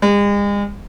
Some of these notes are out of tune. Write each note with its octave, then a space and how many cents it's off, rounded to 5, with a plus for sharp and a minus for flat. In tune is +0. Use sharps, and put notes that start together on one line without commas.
G#3 -40